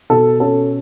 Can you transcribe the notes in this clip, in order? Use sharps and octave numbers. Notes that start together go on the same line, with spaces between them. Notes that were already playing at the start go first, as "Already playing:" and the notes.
B2 A4
C#4 A4